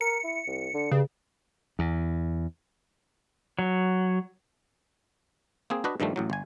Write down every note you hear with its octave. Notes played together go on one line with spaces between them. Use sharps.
A#4 C#7
E4
C2
D3
G2 C#3
E2
F#3
A#3 C4 G#4
D4 F#4 B4 D#5
G2 D#3 F3 G3 A3
A1 A2 F#3
G1 G#5